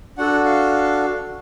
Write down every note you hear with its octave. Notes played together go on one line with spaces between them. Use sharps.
D4 F#4 A4 F#5
F5